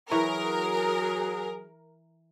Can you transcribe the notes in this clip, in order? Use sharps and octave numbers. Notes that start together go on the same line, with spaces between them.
E3 F#3 G#4 A#4 C#5